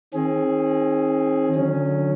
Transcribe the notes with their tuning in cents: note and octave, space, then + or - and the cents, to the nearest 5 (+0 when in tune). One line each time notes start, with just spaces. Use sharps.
D#3 +25 C4 +45 G#4 +10
D3 +0 F#3 -35 C#4 +0